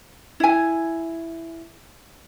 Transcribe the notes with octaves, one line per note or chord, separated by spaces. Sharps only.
E4 G#5